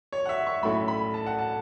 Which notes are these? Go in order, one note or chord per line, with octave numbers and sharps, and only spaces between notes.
C#5
F#5
E5
C#6
B1 A2 A3 C#4 E4 B5
B5
A5
F#5
A5